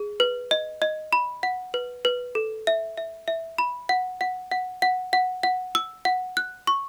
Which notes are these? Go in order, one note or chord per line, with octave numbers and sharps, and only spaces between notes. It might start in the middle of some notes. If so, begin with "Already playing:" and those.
Already playing: G#4
B4
D#5
D#5
B5
F#5
B4
B4
A4
E5
E5
E5
B5
F#5
F#5
F#5
F#5
F#5
F#5
E6
F#5
F#6
C#6